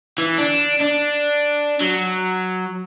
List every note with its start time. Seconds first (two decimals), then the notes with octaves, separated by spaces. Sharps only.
0.18 E3
0.38 D4
0.80 D4
1.81 F#3